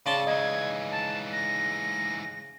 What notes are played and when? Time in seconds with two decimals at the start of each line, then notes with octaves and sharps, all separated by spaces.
0.06 A2 C#3 D5 A5 C6
0.27 G#2 E3 D#5 G#6
0.91 A5
1.33 A#6